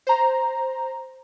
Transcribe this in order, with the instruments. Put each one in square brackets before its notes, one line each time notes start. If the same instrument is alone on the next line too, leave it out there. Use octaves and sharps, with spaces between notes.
[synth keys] C5 A#5